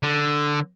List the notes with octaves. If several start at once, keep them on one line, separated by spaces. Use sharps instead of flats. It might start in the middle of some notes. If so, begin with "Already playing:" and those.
D3